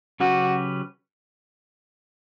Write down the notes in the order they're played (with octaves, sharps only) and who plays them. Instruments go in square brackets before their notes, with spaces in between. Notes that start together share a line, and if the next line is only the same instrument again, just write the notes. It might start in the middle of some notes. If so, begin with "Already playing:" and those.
[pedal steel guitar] C#3 F#3 C#4 G4 B4 [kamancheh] F#4